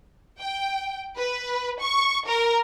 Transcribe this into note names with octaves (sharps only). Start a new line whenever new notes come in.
G5
B4
C#6
A#4